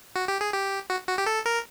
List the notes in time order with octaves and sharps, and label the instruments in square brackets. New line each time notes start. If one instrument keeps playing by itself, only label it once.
[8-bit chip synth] F#4
G4
G#4
G4
F#4
F#4
G4
A4
A#4